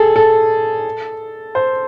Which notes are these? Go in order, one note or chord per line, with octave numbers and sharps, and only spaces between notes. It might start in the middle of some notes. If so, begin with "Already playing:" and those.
Already playing: G#4 A4
A4
C5